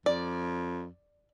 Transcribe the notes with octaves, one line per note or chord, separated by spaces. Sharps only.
F2 D5